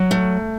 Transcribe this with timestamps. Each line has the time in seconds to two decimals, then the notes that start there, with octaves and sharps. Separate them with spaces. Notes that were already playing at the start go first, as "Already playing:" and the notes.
Already playing: F#3
0.11 A3